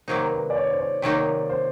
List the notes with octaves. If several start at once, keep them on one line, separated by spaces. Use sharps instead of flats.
C3 D#3 F#3 A#3 D#4 C5
B4
D5
C#5
C5
C#5
C3 D#3 F#3 A#3 D#4 C#5
C5